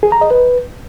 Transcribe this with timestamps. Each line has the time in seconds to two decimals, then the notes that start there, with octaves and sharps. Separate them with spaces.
0.03 G#4
0.12 A#5
0.21 D#5
0.31 B4